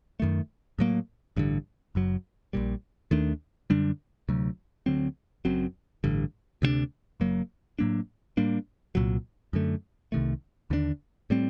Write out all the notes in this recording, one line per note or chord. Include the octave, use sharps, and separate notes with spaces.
F#2 D#3 A3
A2 F#3 A#3
A1 G2 D3
F#1 F#2 F#3
A#1 A#2 G3
D#2 D#3 A3 D4
F#2 D3 G3 D4
D2 C3 F#3
D2 D3 F#3 C4
F#1 F#2 F#3 C4
A1 G2 D3
D2 C3 G3 D4
F#1 F#2 F#3 A#3
A2 F#3 A#3 D4
A2 G3 A#3 D4
C2 A#2 F#3
F#2 D3 A3
C2 C3 D#3 A3
D#2 D3 A3 D4
A2 G3 C4